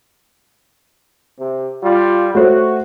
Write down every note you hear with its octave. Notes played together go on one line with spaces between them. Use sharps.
C3
G3 F4
A3 F#4 C5